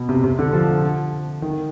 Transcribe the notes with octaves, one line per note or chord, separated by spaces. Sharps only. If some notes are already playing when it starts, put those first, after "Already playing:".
Already playing: B2
C3
C3
D3
F3
D#3